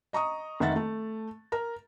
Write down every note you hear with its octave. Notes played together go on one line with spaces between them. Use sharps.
D#5 A#5 C#6 D#6
F1 D#3 E5 F#5 A6
A3
A#4 A#5